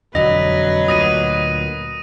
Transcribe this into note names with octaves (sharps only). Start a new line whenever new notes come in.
E1 F2 D3 F#3 B4 D#5 A#6
D2 A#2 D#6 A#6 D#7